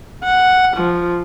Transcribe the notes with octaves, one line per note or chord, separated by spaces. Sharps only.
F#5
F3